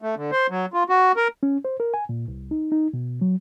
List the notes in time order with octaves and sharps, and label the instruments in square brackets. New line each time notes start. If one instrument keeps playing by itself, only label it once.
[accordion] A3
D3
C5
F#3
F4
F#4
A#4
[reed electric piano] C#4
C5
A#4
G#5
A#2
C2
D#4
D#4
B2
F#3